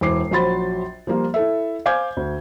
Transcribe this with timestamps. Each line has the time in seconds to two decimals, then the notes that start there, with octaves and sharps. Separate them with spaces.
0.01 E1 E4 C5 D6 C7
0.31 A#1 F#3 C5 B5 C6 A6
1.07 F3 G3 A#3 F4
1.34 E4 A4 E5
1.85 C5 F5 G#5 D6 G6 G#6
2.17 D2